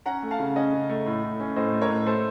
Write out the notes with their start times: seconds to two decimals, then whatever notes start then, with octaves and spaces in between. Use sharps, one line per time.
0.06 C#4 F#5 A#5
0.23 A3
0.31 F5 A5
0.39 C#3
0.56 C#4 D#5 F#5
0.73 C#3
0.89 A3
1.06 A2
1.23 A2
1.40 C#4
1.56 A2 C5 D#5
1.73 A3
1.81 A#4 C#5
1.90 A2
2.06 A3 A4 C5